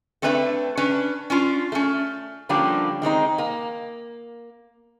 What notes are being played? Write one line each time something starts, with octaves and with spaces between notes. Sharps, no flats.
A3 C4 D4 B4 D#5 E5
C#4 D4 B4
C#4 D4 F4
A3 C#4
D3 F3 G3 A#3 C#4 D4
D#3 G#3 C4 D#4
A#3